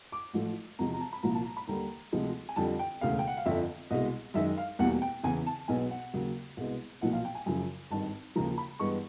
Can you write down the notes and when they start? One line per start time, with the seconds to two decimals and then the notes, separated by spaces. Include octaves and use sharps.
0.12 D6
0.33 A1 A2 F3 A3
0.79 E2 C3 F3 G#3 A#5
0.94 A#5
1.00 A5
1.13 B5
1.23 C2 A#2 F3 A#3 A#5
1.35 A5
1.45 A#5
1.57 B5
1.67 D#2 D3 G3 A#5
2.12 D2 C3 F3 G#3
2.49 G#5
2.56 F2 D3 G3 A5
2.79 G5
3.01 E1 D2 C#3 F5
3.19 G5
3.27 F#5
3.37 F5
3.46 G1 F2 D3 E5
3.90 C2 B2 G#3 D#5
4.34 F#2 D#3 G#3 E5
4.57 F5
4.79 E2 B2 G3 A#3 F#5
5.02 G5
5.23 E2 C#3 E3 G#5
5.46 A5
5.68 B1 B2 G#3 B3 G#5
5.90 F#5
6.13 D#2 C#3 F#3
6.57 C2 B2 G#3 B3
7.01 B1 A#2 F3 A#3 F#5
7.13 F5
7.25 G5
7.35 G#5
7.46 F#2 C#3 F3 G#5
7.91 G#1 G2 D#3 A5
8.36 D#2 C#3 F3 A#5
8.58 B5
8.79 G2 E3 G#3 B3 C#6